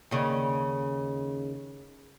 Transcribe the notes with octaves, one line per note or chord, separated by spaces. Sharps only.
D#2 C#3